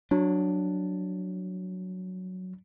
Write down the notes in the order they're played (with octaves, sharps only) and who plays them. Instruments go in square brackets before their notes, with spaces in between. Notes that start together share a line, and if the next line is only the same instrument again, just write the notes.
[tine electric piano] F#3 [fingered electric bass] D4